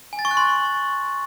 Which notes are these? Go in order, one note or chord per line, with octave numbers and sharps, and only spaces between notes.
G#5
A6
C#6
F#6
C6